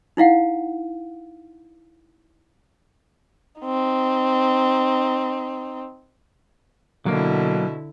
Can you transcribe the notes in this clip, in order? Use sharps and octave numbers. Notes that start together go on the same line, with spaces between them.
D#4 E4 F5 F#5
C4 D#4
B2 D3 F#3 A#3 E4